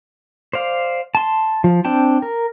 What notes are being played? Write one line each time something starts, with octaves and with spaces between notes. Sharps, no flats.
C5 D5 F5
A5 C6
F3
C4 D4 G5 A5
A#4